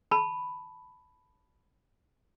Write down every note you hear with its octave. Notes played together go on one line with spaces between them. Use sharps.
A5 B5